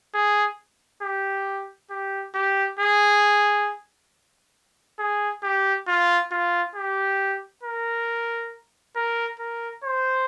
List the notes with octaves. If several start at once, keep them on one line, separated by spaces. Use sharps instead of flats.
G#4
G4
G4
G4
G#4
G#4
G4
F4
F4
G4
A#4
A#4
A#4
C5